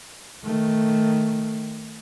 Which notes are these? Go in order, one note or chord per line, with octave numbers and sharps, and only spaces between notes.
D#3 A3